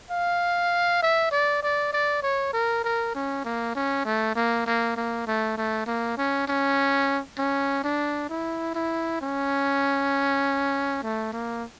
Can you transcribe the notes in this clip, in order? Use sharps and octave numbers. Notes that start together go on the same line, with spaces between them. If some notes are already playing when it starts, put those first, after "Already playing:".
F5
E5
D5
D5
D5
C#5
A#4
A#4
C#4
A#3
C#4
A3
A#3
A#3
A#3
A3
A3
A#3
C#4
C#4
C#4
D4
E4
E4
C#4
A3
A#3